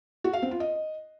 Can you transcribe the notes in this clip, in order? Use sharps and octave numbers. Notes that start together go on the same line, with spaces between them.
F#4
F5
C4
F4
D#5